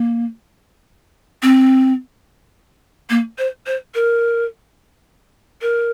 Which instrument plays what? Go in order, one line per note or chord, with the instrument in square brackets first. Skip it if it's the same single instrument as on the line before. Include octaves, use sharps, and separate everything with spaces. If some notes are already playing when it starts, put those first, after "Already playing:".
Already playing: [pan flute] A#3
C4
A#3
C5
C5
A#4
A#4